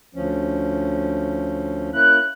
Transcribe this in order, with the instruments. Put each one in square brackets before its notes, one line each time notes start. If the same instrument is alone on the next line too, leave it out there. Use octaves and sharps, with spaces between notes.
[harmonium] D2 F3 C#4
[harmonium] A#3 C#4 E4 [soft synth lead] F#6